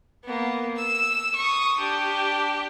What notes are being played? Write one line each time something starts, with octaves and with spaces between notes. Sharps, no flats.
A#3 B3
E6
C#6 D#6
D4 G4